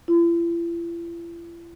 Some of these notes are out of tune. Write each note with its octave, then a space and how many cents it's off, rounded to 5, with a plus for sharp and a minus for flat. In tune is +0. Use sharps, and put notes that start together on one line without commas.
E4 +45